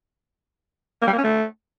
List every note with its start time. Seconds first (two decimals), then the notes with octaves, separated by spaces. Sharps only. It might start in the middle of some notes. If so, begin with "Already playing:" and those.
1.02 A#3
1.07 G3
1.13 A#3
1.18 C#4
1.24 A3